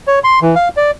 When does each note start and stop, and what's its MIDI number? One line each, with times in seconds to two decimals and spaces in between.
0.07 0.19 73
0.24 0.39 84
0.41 0.55 52
0.56 0.69 77
0.77 0.91 74